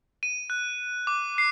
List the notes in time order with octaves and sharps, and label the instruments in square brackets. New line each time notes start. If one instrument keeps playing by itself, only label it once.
[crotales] D#7
F#6
D6
C7